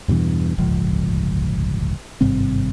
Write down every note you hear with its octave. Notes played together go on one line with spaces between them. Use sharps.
E2 G2 B2 E3
D1 G1 C#2 F3
G#1 G2 C3 C4